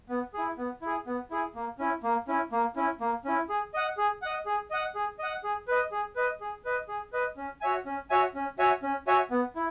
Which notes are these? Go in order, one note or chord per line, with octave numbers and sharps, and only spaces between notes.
B3
E4 G#4
B3
E4 G#4
B3
E4 G#4
A#3
C#4 E4
A#3
C#4 E4
A#3
C#4 E4
A#3
C#4 E4
G#4
D#5 F#5
G#4
D#5 F#5
G#4
D#5 F#5
G#4
D#5 F#5
G#4
B4 D#5
G#4
B4 D#5
G#4
B4 D#5
G#4
B4 D#5
C#4
F#4 C#5 E5 G#5
C#4
F#4 C#5 E5 G#5
C#4
F#4 C#5 E5 G#5
C#4
F#4 C#5 E5 G#5
B3
E4